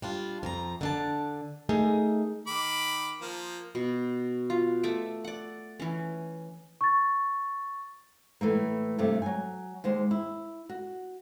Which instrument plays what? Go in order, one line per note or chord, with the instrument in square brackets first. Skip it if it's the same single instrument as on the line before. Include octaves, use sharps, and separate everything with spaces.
[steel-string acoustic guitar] G3 D4 F4
F2 F3 A#5
D3 D4 A5
A3 D#4 G#4 A#4
[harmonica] D#3 B5 D6
F3 A#3
[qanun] B2
F4
A3 E5 D6
D5 F#5
E3 C#4
[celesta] C#6 A6
[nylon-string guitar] A2 E3 A3 A#3
G2 C3 A3
F#3 G#5
D#2 G#3 C5
E4
F#4